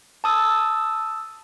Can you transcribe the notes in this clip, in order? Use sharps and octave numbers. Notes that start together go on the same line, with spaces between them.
A5 D#6 E6